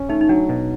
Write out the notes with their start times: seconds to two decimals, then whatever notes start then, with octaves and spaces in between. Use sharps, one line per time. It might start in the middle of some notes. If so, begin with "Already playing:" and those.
Already playing: C#4
0.09 A3 D#4
0.21 D#4
0.29 F#3 D4
0.49 B2